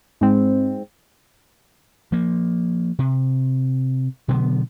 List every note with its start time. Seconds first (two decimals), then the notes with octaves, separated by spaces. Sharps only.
0.21 G#2 G#3 C4
2.12 F3 A#3
2.99 C3
4.28 B2 D3 F#3 B3